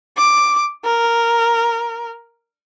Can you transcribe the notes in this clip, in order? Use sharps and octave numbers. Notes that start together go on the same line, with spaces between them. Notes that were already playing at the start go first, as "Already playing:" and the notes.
D6
A#4